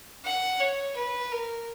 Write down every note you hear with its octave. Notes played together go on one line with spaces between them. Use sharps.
F#5
C#5
B4
A#4